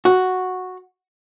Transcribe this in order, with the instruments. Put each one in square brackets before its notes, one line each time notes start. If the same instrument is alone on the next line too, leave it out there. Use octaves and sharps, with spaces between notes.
[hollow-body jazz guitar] F#4